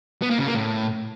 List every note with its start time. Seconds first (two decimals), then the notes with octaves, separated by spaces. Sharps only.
0.22 B3
0.30 A#3
0.39 C#3
0.47 A#3
0.55 A2